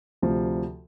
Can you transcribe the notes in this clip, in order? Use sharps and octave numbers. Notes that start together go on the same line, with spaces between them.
D2 C3 F3